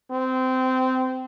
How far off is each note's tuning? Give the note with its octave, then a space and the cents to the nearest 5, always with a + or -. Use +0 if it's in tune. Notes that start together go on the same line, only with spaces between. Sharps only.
C4 -20